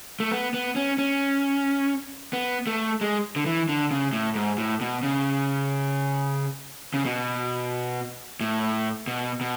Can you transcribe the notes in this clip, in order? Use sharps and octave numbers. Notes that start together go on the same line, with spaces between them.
A3
B3
B3
C#4
C#4
B3
A3
G#3
D3
E3
D3
C#3
A2
G#2
A2
B2
C#3
C#3
B2
A2
B2
B2